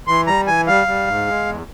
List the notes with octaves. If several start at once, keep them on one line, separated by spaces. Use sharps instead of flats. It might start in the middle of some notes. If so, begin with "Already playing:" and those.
E3 C6
G3 A#5
E3 G#5
G3 F5
G3
G#2
G#3
E2